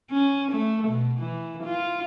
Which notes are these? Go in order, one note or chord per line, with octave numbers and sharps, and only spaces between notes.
C#4
A3
B2
E3
F4